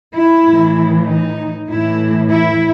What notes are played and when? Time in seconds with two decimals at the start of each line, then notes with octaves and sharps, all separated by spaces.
0.15 E4
0.45 A2
0.50 E3
1.06 D#4
1.70 A2 E3 E4
2.31 E4